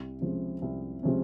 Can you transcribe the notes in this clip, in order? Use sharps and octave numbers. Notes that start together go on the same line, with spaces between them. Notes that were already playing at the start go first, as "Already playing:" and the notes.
Already playing: C2
C3 F3 G#3 C#4
C2
C3 F3 G#3 C#4